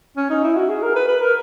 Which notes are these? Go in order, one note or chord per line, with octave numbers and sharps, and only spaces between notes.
C#4
D#4
E4
F#4
G#4
A#4
B4
B4
A#4